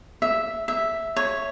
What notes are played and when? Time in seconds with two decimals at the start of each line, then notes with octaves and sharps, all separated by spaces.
0.22 E5
0.68 E5
1.16 C#5